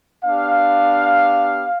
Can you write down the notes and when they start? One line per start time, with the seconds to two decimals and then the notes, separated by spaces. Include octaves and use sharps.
0.24 B3 D4 G4 F5